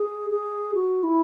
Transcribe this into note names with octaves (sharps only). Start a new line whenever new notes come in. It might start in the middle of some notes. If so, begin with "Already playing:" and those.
Already playing: G#4
G#4
F#4
E4